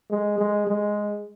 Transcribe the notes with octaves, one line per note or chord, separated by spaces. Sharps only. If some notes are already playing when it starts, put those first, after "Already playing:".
G#3
G#3
G#3